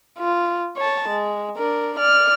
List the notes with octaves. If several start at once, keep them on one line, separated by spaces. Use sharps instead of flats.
F4
C#5 A5
G#3
D4 A#4
D5 F6